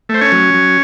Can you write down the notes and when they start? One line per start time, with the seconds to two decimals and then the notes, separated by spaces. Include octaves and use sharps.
0.09 A3
0.14 C5
0.21 C#4 C#5
0.32 F#3
0.54 F#3